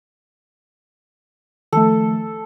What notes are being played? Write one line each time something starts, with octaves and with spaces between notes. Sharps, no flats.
D#3 F3 A3 A4